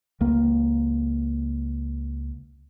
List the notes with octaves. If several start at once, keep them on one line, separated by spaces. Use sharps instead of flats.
C#2 A#3